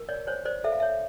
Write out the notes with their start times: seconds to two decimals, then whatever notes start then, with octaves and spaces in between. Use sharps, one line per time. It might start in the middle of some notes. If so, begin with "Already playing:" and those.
Already playing: A#4
0.09 C#5 D5
0.27 C5 C#5
0.45 C5 D5
0.64 A4 E5
0.72 F5
0.80 C#5 E5